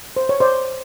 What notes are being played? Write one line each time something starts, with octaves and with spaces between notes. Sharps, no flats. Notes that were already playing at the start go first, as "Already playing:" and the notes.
C5
C#5
C5 D5